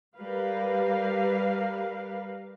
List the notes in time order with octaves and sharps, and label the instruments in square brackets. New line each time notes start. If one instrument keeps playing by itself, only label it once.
[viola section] G3 A#4 B4 F5